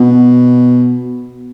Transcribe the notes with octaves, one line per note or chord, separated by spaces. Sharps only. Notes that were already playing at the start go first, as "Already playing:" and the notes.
Already playing: B2